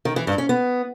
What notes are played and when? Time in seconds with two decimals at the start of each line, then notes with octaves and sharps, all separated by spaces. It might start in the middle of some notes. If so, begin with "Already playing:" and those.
0.05 D#3
0.16 E3
0.27 G2
0.38 C#4
0.49 B3